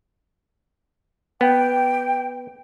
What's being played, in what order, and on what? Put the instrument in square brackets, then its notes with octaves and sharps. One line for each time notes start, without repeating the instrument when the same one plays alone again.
[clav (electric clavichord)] B3 [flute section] G5